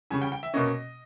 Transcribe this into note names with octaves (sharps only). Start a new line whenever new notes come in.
C#3 G3 C#4 G#5
G5
G5
E5
B2 A#3 C#4 D#5